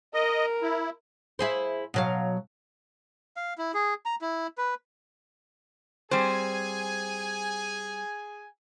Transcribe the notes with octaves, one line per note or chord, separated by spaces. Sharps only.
A#4 D#5
E4
E4 G#4 C5
B2 F#3 F5
F5
E4
G#4
A#5
E4
B4
G3 C4 G#4 C5 G#5